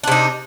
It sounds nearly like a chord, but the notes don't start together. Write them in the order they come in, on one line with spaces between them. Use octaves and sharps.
D4 C3 D#4